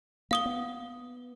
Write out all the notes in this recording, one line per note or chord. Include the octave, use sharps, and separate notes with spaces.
A#3 F5 D#6 G7
B3